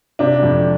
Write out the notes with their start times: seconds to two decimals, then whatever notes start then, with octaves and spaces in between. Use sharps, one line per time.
0.19 C3 D4
0.43 F2